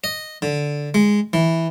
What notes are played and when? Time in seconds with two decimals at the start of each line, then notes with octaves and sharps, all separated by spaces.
0.04 D#5
0.42 D3
0.94 G#3
1.33 E3